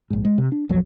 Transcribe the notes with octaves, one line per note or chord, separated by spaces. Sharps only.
A#1 G#2
G#3
C3
D4
A#1 E2 F3 F#3